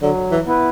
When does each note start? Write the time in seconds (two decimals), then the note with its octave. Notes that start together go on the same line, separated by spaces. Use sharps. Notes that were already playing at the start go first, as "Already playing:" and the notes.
0.02 D3 F#3
0.31 E3
0.47 B3 E4 B4